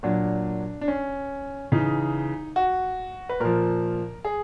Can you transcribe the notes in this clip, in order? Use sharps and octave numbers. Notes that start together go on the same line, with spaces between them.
A#2 F#3 D4
D4
C#4
C#3 E3 D#4
F#4
B4
A#2 F3 A#4
G#4